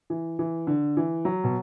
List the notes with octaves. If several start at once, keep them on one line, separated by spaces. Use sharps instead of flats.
E3
E3
D3
E3
F#3
B2